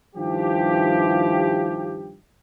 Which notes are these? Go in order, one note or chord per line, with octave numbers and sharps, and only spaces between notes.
G2 D#3 F3 E4 G4